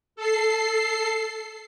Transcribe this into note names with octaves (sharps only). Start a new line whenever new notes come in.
A4 C7